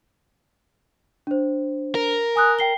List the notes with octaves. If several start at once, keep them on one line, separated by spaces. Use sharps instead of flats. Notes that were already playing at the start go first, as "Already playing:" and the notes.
D4 C5
A#4
G#5 D#6 F#6
G5 C7 G7